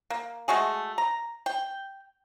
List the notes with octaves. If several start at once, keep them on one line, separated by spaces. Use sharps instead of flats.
A#3
G#3 A3 F#4 G#4
A#5
G5